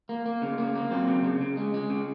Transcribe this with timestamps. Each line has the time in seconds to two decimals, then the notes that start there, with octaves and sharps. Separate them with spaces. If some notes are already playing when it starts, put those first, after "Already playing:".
0.09 A#3
0.26 A#3
0.42 C#3
0.58 A#3
0.75 A#3
0.91 F#3 C4
1.08 C#3
1.24 C#3
1.41 C#3
1.57 G#3
1.74 G#3
1.90 C#3